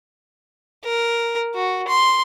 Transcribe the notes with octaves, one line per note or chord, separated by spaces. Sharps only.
A#4
F#4
C6